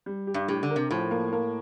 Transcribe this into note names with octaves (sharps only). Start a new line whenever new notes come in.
G3
G4
G2
A2 G4
D3
A#4
C3
A2 F3
A#3
A#3